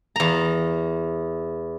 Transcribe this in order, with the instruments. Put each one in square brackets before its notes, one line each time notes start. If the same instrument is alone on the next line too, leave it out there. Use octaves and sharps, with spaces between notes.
[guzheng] E2 A#5